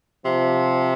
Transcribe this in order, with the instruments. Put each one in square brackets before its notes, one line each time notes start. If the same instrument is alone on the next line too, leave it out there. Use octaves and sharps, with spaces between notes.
[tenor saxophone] C3 [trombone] F3